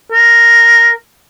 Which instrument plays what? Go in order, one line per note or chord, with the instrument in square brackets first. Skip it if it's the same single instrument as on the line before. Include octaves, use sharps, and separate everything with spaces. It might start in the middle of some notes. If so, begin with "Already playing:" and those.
[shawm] A#4